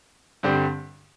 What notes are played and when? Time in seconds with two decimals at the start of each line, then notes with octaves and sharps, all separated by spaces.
0.43 G2 D3 G3 C4